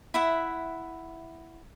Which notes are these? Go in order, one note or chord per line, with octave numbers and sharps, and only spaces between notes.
E4 E5 F#5